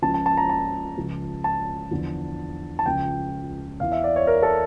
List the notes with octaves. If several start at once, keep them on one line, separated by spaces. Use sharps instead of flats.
C#2 C#3 F3 A5
A5
A5
A#5
A5
C#2 C#3 F3
A5
E2 D3 F3
A5
C#2 C#3 F3 G5
E2 E3 F5
E5
D5
C#5
A#4
A4